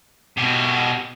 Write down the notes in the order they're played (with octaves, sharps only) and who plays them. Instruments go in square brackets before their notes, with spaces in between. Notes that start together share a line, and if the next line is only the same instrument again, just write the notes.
[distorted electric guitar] B2 G4